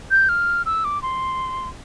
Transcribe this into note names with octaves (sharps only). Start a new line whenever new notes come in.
G6
F6
E6
D6
C6